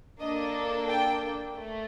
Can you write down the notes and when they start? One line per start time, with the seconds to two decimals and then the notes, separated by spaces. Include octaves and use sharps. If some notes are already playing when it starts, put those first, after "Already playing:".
0.20 A#3 D4 A4 D#5
0.89 G5
1.57 A3